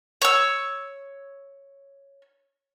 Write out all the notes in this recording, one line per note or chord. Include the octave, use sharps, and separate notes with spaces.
C#5 E6